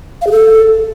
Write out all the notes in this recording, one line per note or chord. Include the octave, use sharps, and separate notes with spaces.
F5
G#4
A4